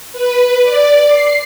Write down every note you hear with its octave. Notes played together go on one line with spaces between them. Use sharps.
B4
D5
C7